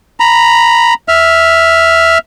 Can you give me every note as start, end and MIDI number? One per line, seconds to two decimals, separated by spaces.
0.20 0.94 82
0.20 0.94 83
1.08 2.18 76
1.08 2.18 89